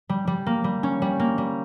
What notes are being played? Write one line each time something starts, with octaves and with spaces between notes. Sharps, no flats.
G3
G3
A#3
G3
C#4
G3
A#3
G3